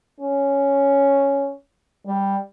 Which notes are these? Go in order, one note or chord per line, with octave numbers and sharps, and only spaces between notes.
C#4
G3